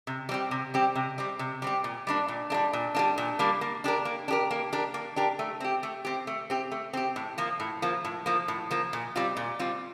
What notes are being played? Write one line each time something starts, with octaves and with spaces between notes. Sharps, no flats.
C3
G3 C4 G4
C3
G3 C4 G4
C3
G3 C4 G4
C3
G3 C4 G4
A#2
G3 A#3 D4
A#2
G3 A#3 D4
A#2
G3 A#3 D4
A#2
G3 A#3 D4
A#3
D4 G4 A#4
A#3
D4
G4 A#4
A#3
D4 G4 A#4
A#3
D4 G4 A#4
A3
C4 G4
A3
C4 G4
A3
C4 G4
A3
C4 G4
A2
F3 A#3
A2
F3 A#3
A2
F3 A#3
A2
F3 A#3
A#2
G3 C4 F4
A#2
G3 C4 F4